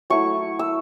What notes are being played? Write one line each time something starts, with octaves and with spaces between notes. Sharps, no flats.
F#3 A3 E4 C#6
E6